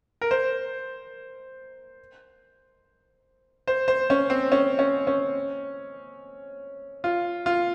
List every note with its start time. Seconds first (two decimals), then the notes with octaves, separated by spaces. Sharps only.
0.21 A#4
0.31 C5
3.67 C5
3.88 C5
4.10 C#4
4.30 C4
4.52 C#4
4.79 C#4
5.07 C#4
7.04 F4
7.46 F4